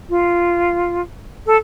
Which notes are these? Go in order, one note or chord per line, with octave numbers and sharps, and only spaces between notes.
F4
A4